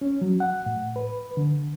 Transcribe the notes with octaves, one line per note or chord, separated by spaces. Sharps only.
C#4
F#3
F#5
A2
B4
D3